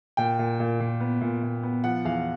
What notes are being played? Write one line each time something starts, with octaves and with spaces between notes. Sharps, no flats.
A#2 G5
A#2
A#2
A#2
B3
A#2
A#2
B3
F3 F#5
E2 F5